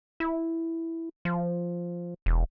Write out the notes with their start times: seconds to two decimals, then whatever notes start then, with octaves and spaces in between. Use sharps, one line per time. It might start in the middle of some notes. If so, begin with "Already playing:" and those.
0.20 E4
1.25 F3
2.26 E1